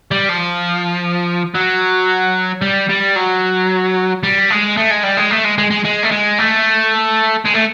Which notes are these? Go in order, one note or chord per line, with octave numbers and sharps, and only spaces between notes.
G3
F3
F#3
G3
G3
F#3
G3
G#3
A3
G#3
G3
G#3
A3
G#3
G#3
G#3
G#3
A3
G#3
A3
G#3
A3